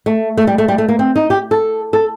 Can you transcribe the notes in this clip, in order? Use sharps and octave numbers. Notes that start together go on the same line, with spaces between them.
A3
A3
G3
A3
G3
A3
A#3
C4
D#4
G4
A4
A4